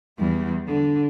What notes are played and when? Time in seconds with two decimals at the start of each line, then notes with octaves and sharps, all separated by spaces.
0.18 E2 G3
0.67 D3